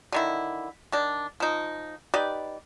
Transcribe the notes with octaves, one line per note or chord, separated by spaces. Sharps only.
D3 D#3 E4
D#3 D4
F3 D#4
D#4 G4 B4 D5